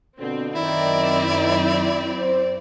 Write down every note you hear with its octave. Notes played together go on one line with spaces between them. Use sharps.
F2 B2 D3 C4
F#2 D#3 C4 E4 D5
C5